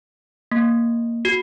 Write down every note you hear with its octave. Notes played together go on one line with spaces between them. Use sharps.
A#3
F#4